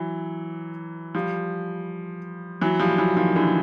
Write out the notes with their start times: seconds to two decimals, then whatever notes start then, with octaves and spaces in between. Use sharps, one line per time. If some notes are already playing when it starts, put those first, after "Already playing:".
Already playing: E3 F#3
1.15 F3 G3
2.61 E3 F#3
2.79 F3 G3
2.98 E3 F#3
3.17 D#3 F3
3.36 D3 E3